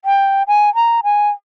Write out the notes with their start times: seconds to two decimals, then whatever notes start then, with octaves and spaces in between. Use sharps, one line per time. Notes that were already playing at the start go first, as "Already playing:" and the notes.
0.05 G5
0.48 G#5
0.75 A#5
1.04 G#5